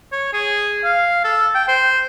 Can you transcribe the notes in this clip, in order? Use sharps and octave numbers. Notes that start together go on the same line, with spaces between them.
C#5
G#4
F5
A4
G5
C5